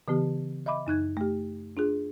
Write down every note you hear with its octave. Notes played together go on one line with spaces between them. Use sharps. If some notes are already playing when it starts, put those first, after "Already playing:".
C#3 E3 B3 G4
D#5 E5 B5 D6
F#2 D#4 F#6 G#6
A3 G4
D4 F4 G#4